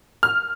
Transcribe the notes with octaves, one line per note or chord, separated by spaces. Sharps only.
F6